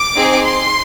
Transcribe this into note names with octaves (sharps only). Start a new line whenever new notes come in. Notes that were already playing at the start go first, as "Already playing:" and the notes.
Already playing: D6
C4 D#4 G#4
C6